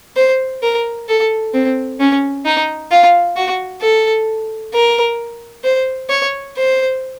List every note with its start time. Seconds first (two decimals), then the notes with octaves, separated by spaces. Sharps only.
0.17 C5
0.63 A#4
1.08 A4
1.54 C4
2.00 C#4
2.46 D#4
2.91 F4
3.36 F#4
3.82 A4
4.74 A#4
5.64 C5
6.10 C#5
6.57 C5